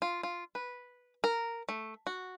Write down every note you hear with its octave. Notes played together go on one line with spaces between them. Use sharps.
F4
F4
B4
A#4
A3
F#4